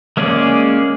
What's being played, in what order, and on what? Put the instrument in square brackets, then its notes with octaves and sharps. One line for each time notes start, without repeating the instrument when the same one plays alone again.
[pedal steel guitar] G#3 A#3 C#4 G#4 D5